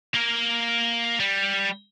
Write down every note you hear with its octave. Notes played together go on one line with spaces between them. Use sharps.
A#3 A#4
G3